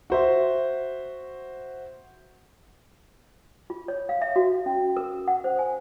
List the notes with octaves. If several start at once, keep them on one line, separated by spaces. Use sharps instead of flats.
F#4 C5 E5
F4
C#5
F5
E5
F#4
C#4
A#4
F#5
C5
G#5